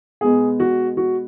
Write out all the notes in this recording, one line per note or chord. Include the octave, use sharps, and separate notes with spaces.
B2 G#3 B3 G#4
F#4
F#4